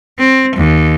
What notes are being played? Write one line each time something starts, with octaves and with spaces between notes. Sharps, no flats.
C4
D#2